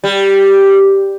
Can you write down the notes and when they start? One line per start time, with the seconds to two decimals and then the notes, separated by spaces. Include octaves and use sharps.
0.04 G3